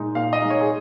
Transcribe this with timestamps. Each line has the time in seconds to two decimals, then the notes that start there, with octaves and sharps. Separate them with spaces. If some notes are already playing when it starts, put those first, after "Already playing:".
Already playing: A#2 G#3 D#4
0.15 A#2 F5
0.33 D#5
0.42 G#3 D#4
0.50 C#5
0.61 G#4